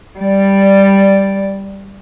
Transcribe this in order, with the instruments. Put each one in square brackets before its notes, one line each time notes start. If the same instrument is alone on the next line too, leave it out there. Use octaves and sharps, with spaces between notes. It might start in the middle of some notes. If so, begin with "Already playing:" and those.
[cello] G3 D5